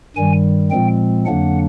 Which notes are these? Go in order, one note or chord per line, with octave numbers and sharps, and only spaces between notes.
G2 D#3 G3 G#5
A#2 F3 G#3 C4 G5
F2 D3 F#3 A#3 D4 F#5